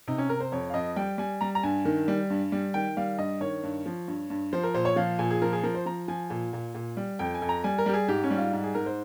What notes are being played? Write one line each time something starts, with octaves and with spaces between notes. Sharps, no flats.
C3 D#4
C#4
C3 A#4
C5
F2 C#5
F5
F2 D#5
G3 G5
G3 G#5
G3 A#5
A#5
G2 G#5
D#3
G3
G2
G3
D#3 G5
G3 F5
G2 D#5
D#3 C#5
G2
F3
G2
G2
F3 C5
A#4
A#2 C5
C#5
F3 F5
A#2 G#5
G#4
F3 A#4
G#4
F3 A#4
C5
F3 A#5
F3 G#5
A#2
A#2
A#2
G3
F2 G5
G#5
F2
A#5
G3 G#5
A#4
G3 G4
G#4
G#2 G4
C#4
G3
F4
G#2
G#4
G#2 A#4
C5